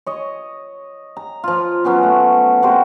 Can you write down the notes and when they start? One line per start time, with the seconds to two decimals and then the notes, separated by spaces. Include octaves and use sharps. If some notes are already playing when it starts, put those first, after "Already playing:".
0.06 C#5 D#5
1.17 A#5
1.44 F3 F4
1.84 F#3 B3 C#4 C5
2.03 A3
2.63 C3 F#4 A#4 C5